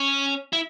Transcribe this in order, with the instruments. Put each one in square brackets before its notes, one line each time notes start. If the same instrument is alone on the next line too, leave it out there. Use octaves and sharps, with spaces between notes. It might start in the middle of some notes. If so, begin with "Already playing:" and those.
Already playing: [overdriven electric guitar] C#4
E4